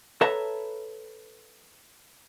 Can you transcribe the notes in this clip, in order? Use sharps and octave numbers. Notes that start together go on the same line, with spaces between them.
A4 B4 C#5 E5 A5 A#5